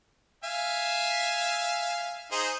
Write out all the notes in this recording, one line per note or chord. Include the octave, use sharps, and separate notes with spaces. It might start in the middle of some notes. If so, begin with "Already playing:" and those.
E5 F5 G#5
D#4 G#4 C5